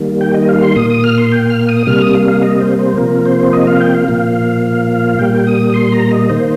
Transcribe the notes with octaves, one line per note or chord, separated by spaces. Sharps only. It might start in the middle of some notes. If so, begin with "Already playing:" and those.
Already playing: D#3 G3 A#3
G5
D#5
F5
C6
A#2 A#3 D#6
D#6
F6
C6
G5
F6
D#6
C3 G3 A#3 F6
D#6
F5
F5
D#5
C5
C5
C3 F3 A#3 A#4
C5
D#5
F5
G5
F5
A#2 F3 A#3
A#2 G3 A#3 G5
D#6
C6
A#5
D#5
D#3 A#3 C5